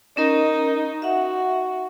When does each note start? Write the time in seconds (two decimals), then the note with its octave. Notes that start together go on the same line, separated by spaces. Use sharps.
0.17 C#4 D#4 A#4 D#5
1.02 F#4 E5 F#5